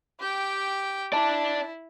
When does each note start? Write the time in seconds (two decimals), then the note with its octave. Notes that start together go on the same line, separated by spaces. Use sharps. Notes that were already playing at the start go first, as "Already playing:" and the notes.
0.20 G4 G5
1.13 E4 D5 A5